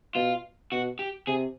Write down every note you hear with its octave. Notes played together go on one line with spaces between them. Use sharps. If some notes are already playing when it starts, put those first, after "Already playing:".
B2 F4
B2 F#4
G4
C3 G#4